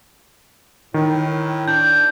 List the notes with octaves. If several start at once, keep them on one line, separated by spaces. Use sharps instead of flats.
A2 D#3
D4 G6